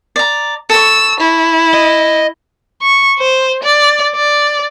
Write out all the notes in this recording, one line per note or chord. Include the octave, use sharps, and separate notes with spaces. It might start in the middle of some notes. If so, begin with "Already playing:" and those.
D5 A#5
A4 C#6 E6
E4
D#5
C#6
C5
D5
D5